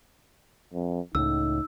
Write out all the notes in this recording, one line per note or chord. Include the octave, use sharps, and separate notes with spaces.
F2
C#2 A2 D#4 E6